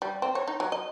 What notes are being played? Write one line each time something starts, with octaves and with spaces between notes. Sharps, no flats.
G3
C4
C#5
D#4
F#3
D#5